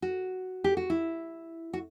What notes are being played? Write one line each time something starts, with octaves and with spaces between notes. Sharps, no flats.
F#4
G4
F#4
E4
F#4